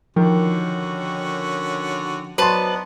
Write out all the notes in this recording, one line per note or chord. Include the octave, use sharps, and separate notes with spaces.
D3 D#3 F3 C#4 F#4
F#3 B3 D4 D#4 B4 C5 A5 C6